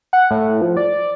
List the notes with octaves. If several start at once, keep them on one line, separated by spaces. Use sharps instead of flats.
F#5
A2
F3
D5